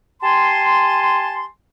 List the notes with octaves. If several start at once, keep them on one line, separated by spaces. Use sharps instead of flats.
G4 G#5 A5 C6